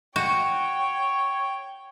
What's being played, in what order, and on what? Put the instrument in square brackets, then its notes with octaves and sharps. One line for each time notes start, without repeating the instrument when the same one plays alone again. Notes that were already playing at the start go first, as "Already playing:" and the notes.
[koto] F#4 [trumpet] C#5 [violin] G5